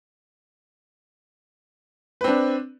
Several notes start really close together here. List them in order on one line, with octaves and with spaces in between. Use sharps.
B4 C4 D4